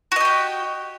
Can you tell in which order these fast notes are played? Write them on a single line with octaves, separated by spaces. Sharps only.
F#4 D#5 G4 G5